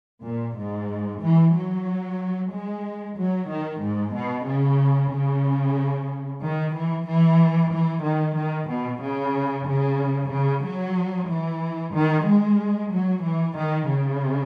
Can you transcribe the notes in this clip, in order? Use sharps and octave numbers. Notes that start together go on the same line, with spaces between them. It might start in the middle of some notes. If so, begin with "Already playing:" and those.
A#2
G#2
E3
F#3
G#3
F#3
D#3
G#2
B2
C#3
C#3
D#3
E3
E3
E3
D#3
D#3
B2
C#3
C#3
C#3
F#3
E3
D#3
G#3
F#3
E3
D#3
C#3